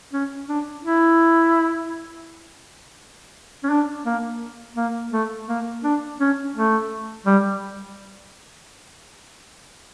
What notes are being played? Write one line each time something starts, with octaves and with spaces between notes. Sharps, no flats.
C#4
D4
E4
C#4
D4
A#3
A#3
A3
A#3
D4
C#4
A3
G3